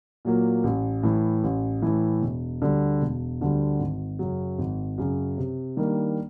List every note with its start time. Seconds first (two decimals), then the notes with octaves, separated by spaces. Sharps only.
0.25 A#2 F#3 A#3
0.64 A1
1.03 A2 E3
1.43 A1
1.82 A2 E3
2.22 E1
2.62 D2 D3 G3
3.01 E1
3.41 D2 D3 G3
3.79 G#1
4.19 F#2 C#3 F#3
4.58 G#1
4.98 F#2 C#3 F#3
5.38 C3
5.77 D#3 G3 A#3 D4